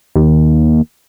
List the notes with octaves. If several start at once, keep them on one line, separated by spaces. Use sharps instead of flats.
D#2